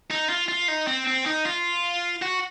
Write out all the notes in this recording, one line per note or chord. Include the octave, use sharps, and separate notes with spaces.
D#4
F4
F4
D#4
C4
C4
D#4
F4
F#4